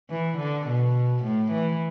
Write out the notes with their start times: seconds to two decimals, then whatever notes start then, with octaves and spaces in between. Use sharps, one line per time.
0.10 E3
0.38 D3
0.67 B2
1.24 A2
1.52 E3